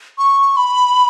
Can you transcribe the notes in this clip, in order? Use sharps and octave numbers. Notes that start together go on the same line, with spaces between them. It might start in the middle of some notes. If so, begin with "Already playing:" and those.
C#6
B5